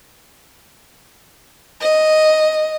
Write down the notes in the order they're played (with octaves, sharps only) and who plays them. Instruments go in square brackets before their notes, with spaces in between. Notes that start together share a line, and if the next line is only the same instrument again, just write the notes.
[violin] D#5